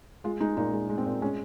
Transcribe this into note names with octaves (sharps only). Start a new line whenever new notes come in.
G#3 F4
G#3 D#4
A#2 D#4
G#3
G#3
C4
A#2
G#3 C#4